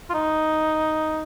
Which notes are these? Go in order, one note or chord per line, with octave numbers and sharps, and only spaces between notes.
F4
D#4